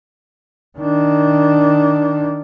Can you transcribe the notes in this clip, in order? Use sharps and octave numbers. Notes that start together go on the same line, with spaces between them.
D#3 D4